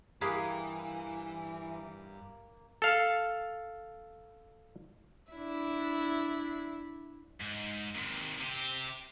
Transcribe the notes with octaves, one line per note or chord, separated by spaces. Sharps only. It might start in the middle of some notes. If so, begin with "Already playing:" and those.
G2 E3 A#3 G4 G#4 B4 D#6
A4 F5
D4 E4
G#2
D#2 C3
C3 G4